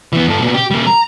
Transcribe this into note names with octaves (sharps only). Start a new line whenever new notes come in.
E3 B3
G2 A4
A#2 B3
G4
G3 A#3
A#5